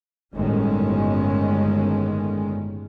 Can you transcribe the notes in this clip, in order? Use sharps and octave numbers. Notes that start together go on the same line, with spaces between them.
G1 A2 D#3 G#3 C#4